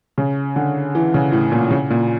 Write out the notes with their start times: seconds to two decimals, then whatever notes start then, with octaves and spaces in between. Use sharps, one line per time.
0.18 C#3
0.56 D3
0.95 E3
1.14 C#3
1.32 A2
1.52 A#2
1.71 C#3
1.91 A#2